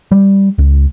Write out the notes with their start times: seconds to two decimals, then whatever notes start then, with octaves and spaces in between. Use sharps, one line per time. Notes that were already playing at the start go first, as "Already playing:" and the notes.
0.12 G3
0.58 C#2